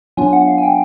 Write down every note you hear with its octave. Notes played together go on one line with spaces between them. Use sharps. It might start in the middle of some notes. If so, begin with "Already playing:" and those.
F#3 B3 D4 F4 G#5
F#5
F5
G#5
G5